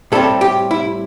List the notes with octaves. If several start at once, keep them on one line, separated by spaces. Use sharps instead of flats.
A2 G3 C4 A4
G4
E4